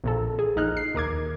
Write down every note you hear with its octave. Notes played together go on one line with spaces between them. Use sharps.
A#1 A#2 A4
G#4
A#1 D#4 F6 F#6
C7
D#2 A#4 D6 G#6